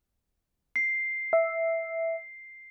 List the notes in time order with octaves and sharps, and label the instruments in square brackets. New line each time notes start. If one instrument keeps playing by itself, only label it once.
[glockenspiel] C7
[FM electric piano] E5